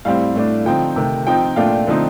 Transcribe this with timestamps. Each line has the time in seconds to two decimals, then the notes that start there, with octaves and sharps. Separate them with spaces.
0.05 A2 G3 C4 F5
0.35 A2 A3 D4
0.66 D3 F3 C4 D#4 G5
0.96 C3 D#3 A3
1.27 F3 C4 D#4 G5
1.56 A#2 A3 D4 F4 F5
1.87 D3 F3 A3 C4 D#4